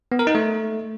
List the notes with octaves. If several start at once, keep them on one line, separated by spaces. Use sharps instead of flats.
B3
A#4
D#4
A3